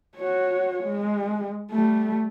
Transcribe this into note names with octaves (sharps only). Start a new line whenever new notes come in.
F#4 C#5
G#3
G3 A3